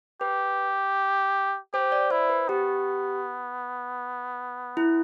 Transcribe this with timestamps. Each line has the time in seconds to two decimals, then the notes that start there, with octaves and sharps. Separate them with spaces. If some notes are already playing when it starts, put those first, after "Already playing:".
0.21 G4 B4
1.74 G4 C5
1.92 D5
2.11 E4 C5
2.29 B4
2.49 B3 G4
4.77 E4